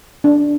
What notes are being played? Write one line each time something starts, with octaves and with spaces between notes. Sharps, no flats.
D4